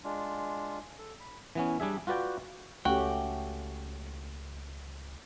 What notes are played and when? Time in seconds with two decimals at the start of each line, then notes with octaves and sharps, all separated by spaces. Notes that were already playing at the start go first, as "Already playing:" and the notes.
0.04 G#3 D4 F4
0.98 A4
1.20 B5
1.55 E3 B3 C#4
1.80 G3 D4 G#4 E5
2.07 F4 F#4 B4 D5 G5
2.85 C#2 A3 C#4 F#4 G4 G5